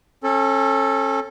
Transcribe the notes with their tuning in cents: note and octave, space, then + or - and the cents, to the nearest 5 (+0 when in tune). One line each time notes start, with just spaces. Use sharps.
C#4 -30 A4 +0